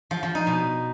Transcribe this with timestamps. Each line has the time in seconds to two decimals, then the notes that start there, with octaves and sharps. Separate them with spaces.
0.11 F3
0.23 F3
0.35 D#4
0.47 B2